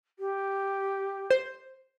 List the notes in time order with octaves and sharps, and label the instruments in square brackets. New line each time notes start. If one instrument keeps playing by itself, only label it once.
[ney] G4
[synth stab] C5